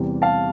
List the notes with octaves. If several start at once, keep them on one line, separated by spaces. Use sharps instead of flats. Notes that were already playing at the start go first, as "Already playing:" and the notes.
Already playing: E2 C3 E3 G3
F5 A5